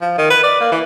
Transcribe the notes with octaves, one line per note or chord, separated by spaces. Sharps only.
F3
D#3
B4
D5
A#3
E3